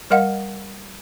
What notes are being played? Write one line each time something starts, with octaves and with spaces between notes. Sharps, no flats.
G3 A#4 D#5 F5 F#5